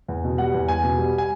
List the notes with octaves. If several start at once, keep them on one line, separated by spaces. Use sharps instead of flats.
E2
B2
G3 F#5
E2
E2 G#5
B2
G3
G#5